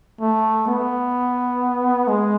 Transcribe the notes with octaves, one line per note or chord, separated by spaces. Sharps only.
A3
B3
G#3